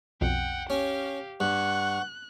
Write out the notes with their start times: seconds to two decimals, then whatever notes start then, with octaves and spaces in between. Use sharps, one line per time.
0.21 B1 F2 F#5 G5
0.70 C#4 G4 F5
1.40 G2 F#5 C#6 F#6